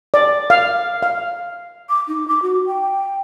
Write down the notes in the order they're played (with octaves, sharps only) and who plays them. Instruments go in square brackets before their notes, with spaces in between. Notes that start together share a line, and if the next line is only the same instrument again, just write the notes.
[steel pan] D5
F5
F5
[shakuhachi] D6
D#4
D6
F#4
G5